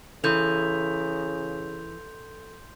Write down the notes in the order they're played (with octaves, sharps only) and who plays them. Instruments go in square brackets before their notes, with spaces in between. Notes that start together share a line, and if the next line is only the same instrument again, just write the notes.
[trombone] C#3 [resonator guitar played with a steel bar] E3 [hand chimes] A4 [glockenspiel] C6 G6 F7